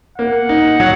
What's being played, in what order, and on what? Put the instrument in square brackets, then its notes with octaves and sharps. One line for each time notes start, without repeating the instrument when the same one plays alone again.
[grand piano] A#3 [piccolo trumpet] F#5
[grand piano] D#4
F#3